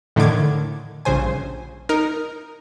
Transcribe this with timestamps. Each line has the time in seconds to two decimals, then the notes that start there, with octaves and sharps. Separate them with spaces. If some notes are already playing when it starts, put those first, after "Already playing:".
0.16 A2 D3 D#3 D6 G#6
1.05 A#1 G2 C#3 C5 G#5
1.89 D#4 A#4